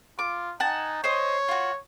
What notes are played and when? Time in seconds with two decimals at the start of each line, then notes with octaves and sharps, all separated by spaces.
0.19 F4 D6
0.60 D#4 F#5 G#5 A5
1.04 C5 C#5 D#5
1.48 F4 F#4